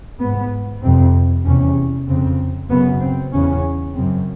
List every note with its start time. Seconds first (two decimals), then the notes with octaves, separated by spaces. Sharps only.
0.20 G#2 B3
0.83 F2 C3 C4
1.44 E2 C3 C#4
2.07 F2 C#3 C4
2.69 F#2 C#3 B3
3.00 C4
3.32 E2 C#3 C#4
3.95 F#2 C#3 C4